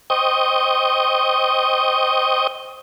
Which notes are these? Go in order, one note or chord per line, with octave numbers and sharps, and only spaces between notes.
C5 D#5 G5 C#6 D#6 G6